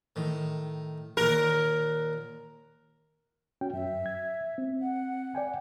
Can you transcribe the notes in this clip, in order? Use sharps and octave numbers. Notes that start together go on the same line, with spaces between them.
A2 D#3
D#2 A#2 A#4 F#5
C#4 F#4 G5
F#2 E5
G#6
C4
F#5
D5 G5 G#5